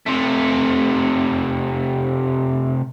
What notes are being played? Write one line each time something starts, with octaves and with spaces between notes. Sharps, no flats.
C3 A3